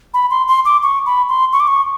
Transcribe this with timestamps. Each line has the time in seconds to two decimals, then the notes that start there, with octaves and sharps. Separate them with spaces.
0.14 B5
0.30 C6
0.48 C6
0.65 D6
0.83 C#6
1.06 B5
1.29 C6
1.53 C#6
1.60 D6
1.68 C#6